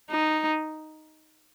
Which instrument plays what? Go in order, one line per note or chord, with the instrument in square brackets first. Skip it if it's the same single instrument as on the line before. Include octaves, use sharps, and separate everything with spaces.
[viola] D#4